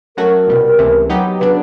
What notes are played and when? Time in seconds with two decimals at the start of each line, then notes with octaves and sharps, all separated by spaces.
0.17 F#3 A3 C#4 F#4 A#4
0.48 C2 B2 G3
0.79 C#2 C3 E3 A3
1.09 F#3 B3 D#4 G4
1.40 C#3 F#3 B3 D4 B4